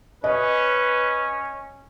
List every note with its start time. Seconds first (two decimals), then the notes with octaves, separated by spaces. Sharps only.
0.24 C#4 B4 D#5